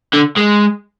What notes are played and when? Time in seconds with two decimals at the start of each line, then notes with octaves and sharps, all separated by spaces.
0.14 D3
0.37 G#3